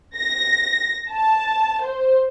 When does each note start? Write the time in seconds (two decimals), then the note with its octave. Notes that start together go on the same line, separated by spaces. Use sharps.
0.16 A#6
1.11 A5
1.82 C5